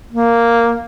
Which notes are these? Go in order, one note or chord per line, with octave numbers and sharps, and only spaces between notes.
A#3